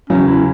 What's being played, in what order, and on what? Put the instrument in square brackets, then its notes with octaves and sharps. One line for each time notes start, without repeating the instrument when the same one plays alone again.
[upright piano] E2 C#3 F#3 [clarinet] C#4
[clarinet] E4